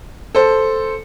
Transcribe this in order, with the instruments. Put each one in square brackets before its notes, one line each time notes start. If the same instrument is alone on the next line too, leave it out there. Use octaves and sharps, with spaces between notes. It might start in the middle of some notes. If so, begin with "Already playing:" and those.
[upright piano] A4 C5